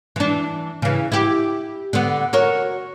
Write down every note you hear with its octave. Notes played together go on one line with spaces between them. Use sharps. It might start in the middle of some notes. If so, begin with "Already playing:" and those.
E3 D4
C#3 E3
E4 G4
D3 B3
F#4 A#4 C#5